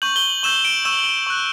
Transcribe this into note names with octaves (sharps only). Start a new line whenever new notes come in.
C#6 G6 F#7
G7
F#7
C#6 E6 G6 E7
D7
C#6 E6 G6 E7
C#6 F#6